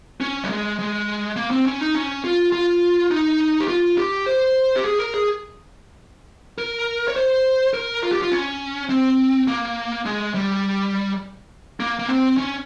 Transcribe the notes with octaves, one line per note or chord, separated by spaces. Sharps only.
C#4
G3
G#3
G#3
A#3
C4
C#4
D#4
C#4
F4
F4
D#4
G4
F4
G4
C5
G4
G#4
A#4
G#4
A#4
C#5
C5
A#4
F4
G4
F4
C#4
C4
A#3
G#3
G3
A#3
A#3
C4
C#4